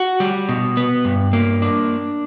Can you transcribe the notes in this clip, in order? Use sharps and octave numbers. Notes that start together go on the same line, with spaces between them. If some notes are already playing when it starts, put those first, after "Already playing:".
Already playing: F#4
G3
B2
B3
G2
A#3
D4